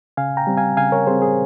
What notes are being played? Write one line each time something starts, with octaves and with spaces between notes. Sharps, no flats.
C#3 F5 G#5
G5 A#5
G3 C4
F5 G#5
C#3 F5 G#5
A#4 C#5
G3 C4 G#4 C5
G#4